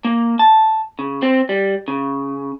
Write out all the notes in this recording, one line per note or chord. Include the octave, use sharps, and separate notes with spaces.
A#3
A5
C#3
C4
G3
C#3